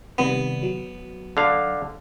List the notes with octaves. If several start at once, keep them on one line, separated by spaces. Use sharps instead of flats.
C3 D#3 G3 B3
F#3
D3 F5